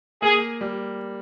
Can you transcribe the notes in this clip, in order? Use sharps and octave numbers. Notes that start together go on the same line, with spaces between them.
A#3 G#4
G3